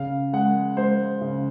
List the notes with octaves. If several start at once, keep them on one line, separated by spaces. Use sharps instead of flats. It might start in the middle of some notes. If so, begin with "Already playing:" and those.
Already playing: C#3 F5
G#3 F#5
G#3 C5
C#3